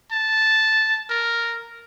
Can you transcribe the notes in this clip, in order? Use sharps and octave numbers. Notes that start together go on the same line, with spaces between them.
A5
A#4